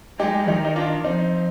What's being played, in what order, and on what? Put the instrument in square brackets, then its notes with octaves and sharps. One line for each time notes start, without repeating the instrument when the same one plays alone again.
[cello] G#3 [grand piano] D#4 G4
[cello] D#3 [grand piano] D#4 G4
[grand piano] D#4
D4 F4
[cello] F3 [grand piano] C4 D#4